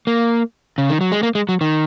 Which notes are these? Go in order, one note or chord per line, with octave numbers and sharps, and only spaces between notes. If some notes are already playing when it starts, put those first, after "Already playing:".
A#3
C#3
D#3
F#3
G#3
A#3
G#3
F#3
D#3